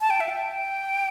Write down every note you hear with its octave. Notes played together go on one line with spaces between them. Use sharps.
A5
G5
E5
G5